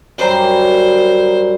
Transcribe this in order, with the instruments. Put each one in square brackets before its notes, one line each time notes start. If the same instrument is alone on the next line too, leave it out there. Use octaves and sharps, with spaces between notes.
[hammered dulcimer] F#2 G3 A#5 [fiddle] C5